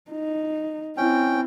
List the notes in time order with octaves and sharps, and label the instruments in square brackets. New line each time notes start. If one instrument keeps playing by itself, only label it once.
[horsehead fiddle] D#4
[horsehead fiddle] C4 E4 [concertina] C#4 G5